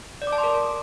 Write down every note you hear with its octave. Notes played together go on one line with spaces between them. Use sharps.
D5
D6
A5
C6
A#4